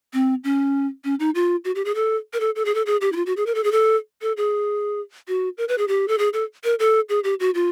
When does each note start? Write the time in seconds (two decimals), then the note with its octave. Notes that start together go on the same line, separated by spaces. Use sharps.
0.13 C4
0.44 C#4
1.04 C#4
1.20 D#4
1.35 F4
1.65 F#4
1.75 G4
1.85 G#4
1.95 A4
2.33 A#4
2.40 A4
2.56 A4
2.65 G#4
2.75 A4
2.86 G#4
3.01 G4
3.12 E4
3.16 F4
3.26 F#4
3.37 G#4
3.46 A#4
3.55 A4
3.64 G#4
3.72 A4
4.22 A4
4.37 G#4
5.28 F#4
5.58 A#4
5.68 B4
5.78 G#4
5.88 G4
6.08 A4
6.18 G#4
6.33 A4
6.64 A#4
6.79 A4
7.09 G#4
7.24 G4
7.40 F#4
7.55 F4